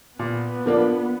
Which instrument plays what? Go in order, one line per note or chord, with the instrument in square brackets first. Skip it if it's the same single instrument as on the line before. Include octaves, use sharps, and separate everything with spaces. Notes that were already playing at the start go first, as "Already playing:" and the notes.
[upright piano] A#2 [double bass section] B3
[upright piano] F3 A#3 D4